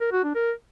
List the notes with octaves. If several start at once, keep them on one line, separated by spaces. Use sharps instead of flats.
A#4
F#4
D4
A#4